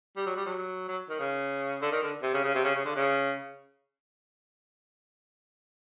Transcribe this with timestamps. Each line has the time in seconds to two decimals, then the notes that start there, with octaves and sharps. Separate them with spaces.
0.17 G3
0.26 F#3
0.36 G3
0.46 F#3
0.88 F#3
1.10 D#3
1.19 C#3
1.82 D3
1.92 D#3
2.02 D3
2.23 C3
2.34 C#3
2.44 C#3
2.55 C3
2.64 C#3
2.75 C#3
2.85 D3
2.96 C#3